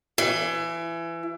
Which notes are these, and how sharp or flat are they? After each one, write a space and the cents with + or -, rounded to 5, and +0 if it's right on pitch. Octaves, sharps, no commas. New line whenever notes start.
E3 +25